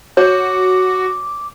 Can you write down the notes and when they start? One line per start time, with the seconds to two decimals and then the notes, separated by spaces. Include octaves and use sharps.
0.17 F#4 C#5 D6